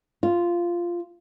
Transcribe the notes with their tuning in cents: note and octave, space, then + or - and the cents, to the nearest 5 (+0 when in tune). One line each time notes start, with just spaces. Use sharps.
F4 -10